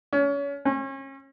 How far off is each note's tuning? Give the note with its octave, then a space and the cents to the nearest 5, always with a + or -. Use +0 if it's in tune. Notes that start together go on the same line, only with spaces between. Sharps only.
C#4 +30
C#4 -35